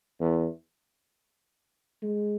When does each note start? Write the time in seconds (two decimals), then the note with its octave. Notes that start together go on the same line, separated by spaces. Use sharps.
0.20 E2
2.03 G#3